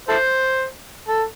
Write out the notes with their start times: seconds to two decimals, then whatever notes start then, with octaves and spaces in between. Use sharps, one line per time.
0.09 E4 A4 C5
1.08 A4